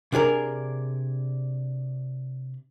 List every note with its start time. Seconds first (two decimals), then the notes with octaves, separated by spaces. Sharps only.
0.12 C3 D4 G#4 A#4